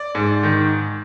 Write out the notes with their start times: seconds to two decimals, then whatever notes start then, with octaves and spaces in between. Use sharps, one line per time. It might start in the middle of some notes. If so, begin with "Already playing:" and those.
Already playing: D5
0.15 G#2
0.43 D#3